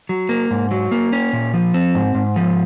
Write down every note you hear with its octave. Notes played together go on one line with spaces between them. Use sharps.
F#3
A#3
G#2
F#3
A#3
C#4
A#2
F3
C4
G#2
G#2
F3